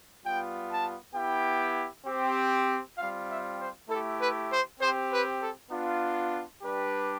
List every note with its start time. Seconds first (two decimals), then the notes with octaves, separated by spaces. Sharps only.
0.23 G3 B3 F4 G5
0.70 A5
1.14 B3 E4 G4 G5
2.06 C4 G4
2.97 G3 C4 F4 F5
3.28 E5
3.59 C5
3.89 A3 E4 G4 A4
4.18 B4
4.50 C5
4.80 C4 G4 C5
5.11 B4
5.40 A4
5.71 B3 D4 F4
6.62 G3 D4 G4 B4